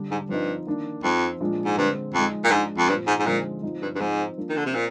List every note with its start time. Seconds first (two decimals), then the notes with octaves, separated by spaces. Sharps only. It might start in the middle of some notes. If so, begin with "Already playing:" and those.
Already playing: D3 G3 D4
0.11 G#2
0.29 G2 F3 C4 D#4
0.67 D#3 A#3 D4
1.04 F2 F3 C4 D#4
1.40 A#2 F3 G#3 D4
1.65 G#2
1.78 G2 D3 G#3 C4
2.14 F2 F3 G#3 D#4
2.44 A#2
2.51 G#2 F3 G#3 D4
2.78 F2
2.89 G2 A#2 F3 C4
3.07 G#2
3.19 G#2
3.26 A#2 D3 F3 G#3 C4 D#4
3.63 F3 C4 D#4
3.82 G2
3.95 G2
4.00 G#2 F3 C4 D#4
4.37 F3 A#3 D4
4.49 D#3
4.57 D3
4.66 C3
4.74 A#2 C4